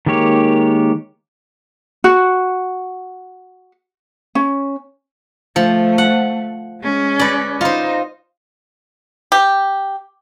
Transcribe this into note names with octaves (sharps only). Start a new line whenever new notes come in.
D#3 G#3 A#3 G4 C#5
F#4
C#4
F3 A3
F#5
G#3 C#4
B4 D5
D#4 F4 C5
G4